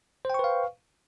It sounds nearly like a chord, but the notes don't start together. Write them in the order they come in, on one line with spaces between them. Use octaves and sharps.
C5 G5 C#6 B4 F5